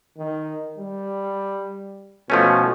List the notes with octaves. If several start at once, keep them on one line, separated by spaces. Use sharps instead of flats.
D#3
G3
B2 F3 A3 C#4